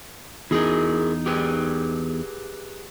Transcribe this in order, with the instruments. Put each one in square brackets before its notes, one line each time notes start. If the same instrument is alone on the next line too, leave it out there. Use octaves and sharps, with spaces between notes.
[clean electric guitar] E2 D#4 [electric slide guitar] E4 G#4 A#4
[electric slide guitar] G4 G#4 B4